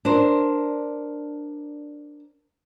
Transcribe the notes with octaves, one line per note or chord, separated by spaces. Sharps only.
D4 A#4 C5